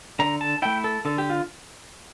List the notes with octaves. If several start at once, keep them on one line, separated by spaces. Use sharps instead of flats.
D3 A#5
A5
A3 E4 G5
A4
D3 A4
G4
F4